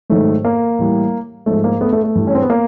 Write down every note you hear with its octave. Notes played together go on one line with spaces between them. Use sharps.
G#2 D#3 F#3 A3
A#3
A2 E3 G3
G#2 F3 A3
A#3
A3 B3
A3 B3
A3
G2 E3 G3
C#4
C4
B3
A#3